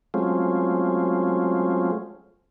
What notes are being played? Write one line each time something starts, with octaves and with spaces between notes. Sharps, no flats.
F#3 G#3 A3 C4 C#4 F4